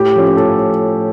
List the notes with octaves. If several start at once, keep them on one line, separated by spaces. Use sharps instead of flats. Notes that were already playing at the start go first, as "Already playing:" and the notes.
Already playing: A2 G4
F3 A3 C#4
A2 A4